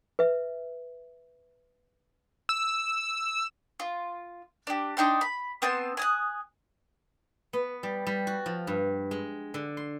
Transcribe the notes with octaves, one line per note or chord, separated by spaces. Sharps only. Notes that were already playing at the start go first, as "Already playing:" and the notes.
B4 E5
E6
F4
D4 G4
D4 D#4 G5 C6
B5
B3 C4 A5 C6
G#5 D#6 F#6
B3
G3
G3
F#4
F3
G2
G#3
D3
C6